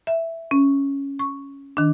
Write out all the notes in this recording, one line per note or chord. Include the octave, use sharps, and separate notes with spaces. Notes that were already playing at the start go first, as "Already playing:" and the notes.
E5
C#4
C#6
D#3 D4